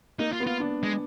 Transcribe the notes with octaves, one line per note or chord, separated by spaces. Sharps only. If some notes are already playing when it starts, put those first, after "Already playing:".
A#3 D#4
F4
B3
F4
D4
G#3